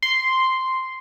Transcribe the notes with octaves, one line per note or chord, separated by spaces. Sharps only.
C6